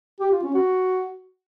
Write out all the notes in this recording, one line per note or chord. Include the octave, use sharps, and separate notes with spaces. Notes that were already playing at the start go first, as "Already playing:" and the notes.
G4
F4
C#4
F#4